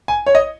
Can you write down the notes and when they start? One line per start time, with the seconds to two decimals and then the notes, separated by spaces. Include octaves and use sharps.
0.08 G#5
0.26 C#5
0.35 D#5